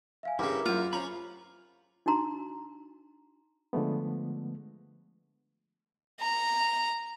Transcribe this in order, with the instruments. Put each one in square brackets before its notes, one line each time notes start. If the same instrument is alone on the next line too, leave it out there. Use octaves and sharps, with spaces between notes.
[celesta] E5 F5 G#5
[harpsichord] G2 C#3 [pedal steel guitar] E4 A#4 E5 [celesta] D6
[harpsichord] F#2 A#5 [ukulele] F4
[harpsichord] C#4 [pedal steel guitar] C5 A#5 B5
[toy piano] D4 D#4 F#4 A#5 C6
[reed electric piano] D3 F3 G#3 A3 B3
[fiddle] A#5